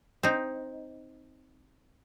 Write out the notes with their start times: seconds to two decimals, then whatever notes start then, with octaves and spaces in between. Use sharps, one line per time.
0.23 C4 D#4